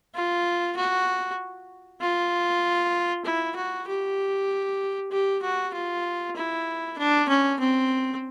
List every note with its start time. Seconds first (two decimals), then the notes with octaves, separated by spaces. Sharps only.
0.15 F4
0.77 F#4
2.01 F4
3.25 E4
3.56 F#4
3.88 G4
5.11 G4
5.42 F#4
5.73 F4
6.36 E4
6.98 D4
7.29 C#4
7.59 C4